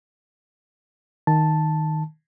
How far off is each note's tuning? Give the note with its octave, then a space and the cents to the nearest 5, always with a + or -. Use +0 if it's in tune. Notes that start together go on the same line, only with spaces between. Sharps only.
D#3 +0 A5 +0